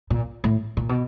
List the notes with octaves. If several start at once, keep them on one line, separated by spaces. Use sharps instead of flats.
A#2
A2
A#2
B2